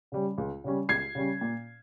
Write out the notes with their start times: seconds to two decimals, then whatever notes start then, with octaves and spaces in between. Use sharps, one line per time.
0.12 C#3 G3 C#4
0.38 C#2
0.64 C#3 G3 C#4
0.89 C#2 G#6 C7
1.15 C#3 G3 C#4
1.41 A#2